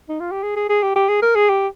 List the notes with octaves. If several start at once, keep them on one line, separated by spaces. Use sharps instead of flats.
D#4
F4
G4
G#4
G#4
G#4
G4
G4
G#4
A#4
G#4
G4